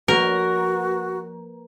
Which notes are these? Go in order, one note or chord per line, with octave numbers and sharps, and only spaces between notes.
F3 A#3 F#4 A#4 B4